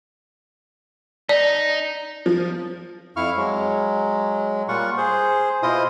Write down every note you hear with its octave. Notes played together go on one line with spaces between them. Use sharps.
D#4 D5
F3
F2 E4 F5 C#6 F6
F#3 G#3
A#2 G3 F4 F#5 C#6
G#4 C5
B2 E4 F4 C5 D#5 D#6